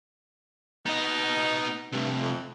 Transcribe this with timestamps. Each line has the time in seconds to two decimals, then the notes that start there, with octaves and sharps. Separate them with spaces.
0.86 B3 D#4 D#5
1.92 G2 C3 A3
2.19 F2